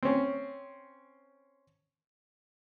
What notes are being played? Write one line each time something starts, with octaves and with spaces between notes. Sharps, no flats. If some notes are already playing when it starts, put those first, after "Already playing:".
C4 C#4